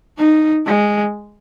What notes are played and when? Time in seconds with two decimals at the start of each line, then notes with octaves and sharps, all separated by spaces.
0.17 D#4
0.66 G#3